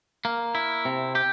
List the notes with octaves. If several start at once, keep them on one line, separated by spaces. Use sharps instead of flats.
A#3
E4
C3
G4